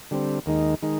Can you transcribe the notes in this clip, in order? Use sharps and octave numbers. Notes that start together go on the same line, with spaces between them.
D3 G3 C4
D#2 D#3 G#3 D#4
D#3 G#3 D#4